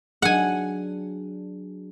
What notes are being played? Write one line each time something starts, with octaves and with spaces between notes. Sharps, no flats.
F#3 D4 G#4 F#5 G#5